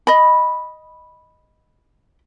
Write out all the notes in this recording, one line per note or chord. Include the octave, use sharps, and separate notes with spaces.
D#5 B5